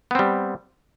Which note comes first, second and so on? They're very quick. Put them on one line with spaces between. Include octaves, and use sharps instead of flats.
B3 C4 G3